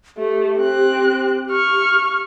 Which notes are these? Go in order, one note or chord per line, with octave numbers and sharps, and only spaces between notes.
A3 G4
C4 F#6
C#6 F6